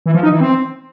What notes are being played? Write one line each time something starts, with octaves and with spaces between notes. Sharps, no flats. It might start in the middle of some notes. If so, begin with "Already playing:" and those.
E3
F3
D#4
E3
C4